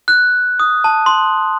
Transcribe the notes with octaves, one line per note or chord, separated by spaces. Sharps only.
F#6
D#6
A5
C6